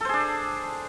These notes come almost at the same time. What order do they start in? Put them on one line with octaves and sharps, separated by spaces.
A4 C5 G#4 D4